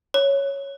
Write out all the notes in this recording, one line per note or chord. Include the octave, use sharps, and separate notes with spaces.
C#5